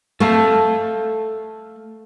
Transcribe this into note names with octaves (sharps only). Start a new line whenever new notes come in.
A3 A4 F5 A5